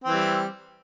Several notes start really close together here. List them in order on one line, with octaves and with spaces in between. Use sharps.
C4 E3 G3